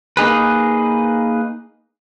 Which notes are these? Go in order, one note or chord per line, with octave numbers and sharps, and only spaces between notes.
A#3 D#4 G#4 B4